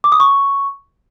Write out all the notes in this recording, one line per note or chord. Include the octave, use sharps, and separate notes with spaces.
D6
D#6
C#6